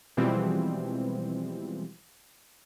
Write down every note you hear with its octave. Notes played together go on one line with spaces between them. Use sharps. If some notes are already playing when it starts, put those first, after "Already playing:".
B2 E3 F3 G3 G#3 C4